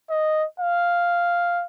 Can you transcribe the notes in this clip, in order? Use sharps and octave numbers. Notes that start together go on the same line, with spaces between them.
D#5
F5